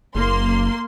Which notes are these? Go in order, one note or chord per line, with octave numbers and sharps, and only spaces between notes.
F#1 A#3 C6